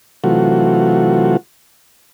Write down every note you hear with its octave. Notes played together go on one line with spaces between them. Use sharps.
C3 E3 F#3 A3 F4 F#4